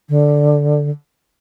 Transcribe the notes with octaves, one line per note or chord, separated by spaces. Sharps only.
D3